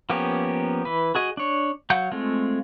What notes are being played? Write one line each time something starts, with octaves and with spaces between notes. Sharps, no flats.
F3 A#3 B3 C#4 G4
E3 B4
F#4 G#4 D#5
D4 C#5
F#3 F5 F#5 G6
G#3 A3 C4 F4